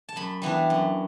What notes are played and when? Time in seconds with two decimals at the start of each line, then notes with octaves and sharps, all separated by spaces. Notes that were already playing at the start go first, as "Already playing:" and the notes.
0.09 A5
0.16 F#2 B5
0.42 E3 G3 B3 D4
0.70 F#2